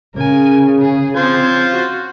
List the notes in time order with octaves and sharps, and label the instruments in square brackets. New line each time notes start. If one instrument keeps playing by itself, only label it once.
[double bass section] C#3 [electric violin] A#4 G#5
[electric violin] G#4
[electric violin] C4 G#6 [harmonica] F4 C5
[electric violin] F#4